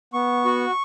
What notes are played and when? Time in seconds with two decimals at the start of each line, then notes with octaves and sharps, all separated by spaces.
0.13 B3 C#6
0.45 F#4